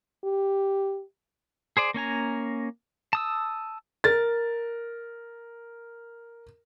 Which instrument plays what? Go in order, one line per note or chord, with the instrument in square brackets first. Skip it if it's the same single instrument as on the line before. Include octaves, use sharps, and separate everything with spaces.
[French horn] G4
[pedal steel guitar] G#4 C5 D5
A#3 C#4 G#5 A#5
A5 D#6 E6
[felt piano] A#4 A6